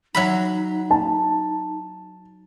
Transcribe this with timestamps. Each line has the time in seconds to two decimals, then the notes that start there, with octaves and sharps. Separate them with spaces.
0.15 F#3 D#4 E5 B5
0.91 A5